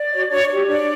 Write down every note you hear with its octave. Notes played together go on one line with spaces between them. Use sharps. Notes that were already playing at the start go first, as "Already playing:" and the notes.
Already playing: D5
F#4 C#5
D4 C#5
G4 C#5
D4 D5